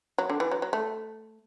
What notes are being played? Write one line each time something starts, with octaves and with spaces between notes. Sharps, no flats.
F#3
D3
E3
F#3
F#3
A3